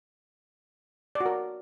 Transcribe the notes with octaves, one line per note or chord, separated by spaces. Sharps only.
D5
F#4
A#4